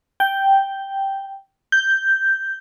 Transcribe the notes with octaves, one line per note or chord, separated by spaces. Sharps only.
G5
G6